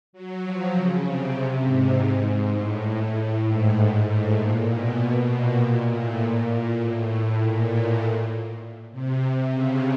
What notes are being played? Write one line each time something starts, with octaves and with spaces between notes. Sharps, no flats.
F#3
F3
C#3
C3
G#2
A2
A2
G#2
A2
A#2
B2
A#2
A2
A#2
A2
A2
A#2
A2
C3
C3
C#3